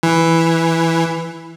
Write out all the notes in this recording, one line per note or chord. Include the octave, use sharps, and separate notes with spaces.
E3